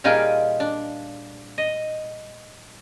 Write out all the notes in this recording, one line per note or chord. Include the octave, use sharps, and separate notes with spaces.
A#2 G3 D#4 F4 G#4 G5
D4
D#5